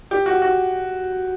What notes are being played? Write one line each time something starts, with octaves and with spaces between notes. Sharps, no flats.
G4
F#4
F#4